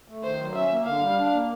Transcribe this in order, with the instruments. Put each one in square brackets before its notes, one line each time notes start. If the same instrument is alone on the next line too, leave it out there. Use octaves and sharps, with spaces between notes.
[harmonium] A3
[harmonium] D#3 [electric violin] C5
[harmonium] F#3
[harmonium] C#4 [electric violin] E5
[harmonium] A#3
[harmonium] D3 [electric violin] F5
[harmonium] G3
D4
A#3